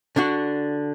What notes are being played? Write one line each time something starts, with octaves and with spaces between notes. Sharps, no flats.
D3 D4 F#4